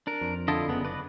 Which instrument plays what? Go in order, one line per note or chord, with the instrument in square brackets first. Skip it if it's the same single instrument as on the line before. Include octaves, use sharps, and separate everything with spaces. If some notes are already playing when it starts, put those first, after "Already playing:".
[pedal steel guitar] D4 A#4
[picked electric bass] F2
[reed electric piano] D3 A5 [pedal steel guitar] E4 F4 D#5
[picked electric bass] F#1 [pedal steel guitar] C#3 B3
[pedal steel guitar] B4 D5 D#5